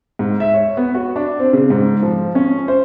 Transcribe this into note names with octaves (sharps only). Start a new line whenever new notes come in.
G#2
E5
C#5
B3
F#4
D4
C4
C#3
G#2
F3
C#4
C5